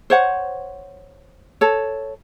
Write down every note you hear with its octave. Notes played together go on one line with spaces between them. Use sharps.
C5 C#5 F#5
A4 C#5